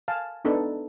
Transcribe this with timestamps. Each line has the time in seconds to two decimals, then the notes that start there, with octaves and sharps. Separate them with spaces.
0.08 F5 G#5 A5
0.45 B3 D4 D#4 A4 B4